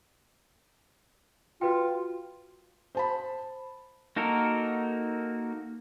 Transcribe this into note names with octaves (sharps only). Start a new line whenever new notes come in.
F4 F#4 B4 G5
C5 A5 B5
A#3 D#4 F#4 A4 A#4